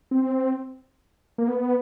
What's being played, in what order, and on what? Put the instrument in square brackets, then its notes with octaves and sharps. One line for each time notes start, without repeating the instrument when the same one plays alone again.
[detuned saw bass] C4
A#3
B3